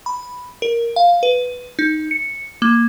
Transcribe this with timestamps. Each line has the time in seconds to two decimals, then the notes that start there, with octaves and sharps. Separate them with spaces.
0.06 B5
0.62 A#4
0.96 F5
1.23 B4
1.79 D#4
2.11 C#7
2.62 A#3